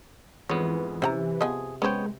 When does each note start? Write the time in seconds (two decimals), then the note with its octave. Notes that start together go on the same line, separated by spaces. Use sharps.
0.49 F2 G#2 E3 B3 C#5
1.02 C3 C#4 F#5 A#5
1.41 F3 B3 G#4 D#5
1.82 G#3 B3 C#4 C5 C#5 G5